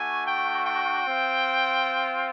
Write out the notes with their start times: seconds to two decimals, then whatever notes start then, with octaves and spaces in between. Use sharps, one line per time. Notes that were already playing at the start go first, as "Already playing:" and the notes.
Already playing: A3 D4 F#4 G#5
0.26 G5
0.65 G5
1.05 C4 F4